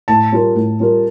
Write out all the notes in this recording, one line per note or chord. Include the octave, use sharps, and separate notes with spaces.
A2 A5
G3 C#4 F4 A#4
A2
G3 C#4 F4 A#4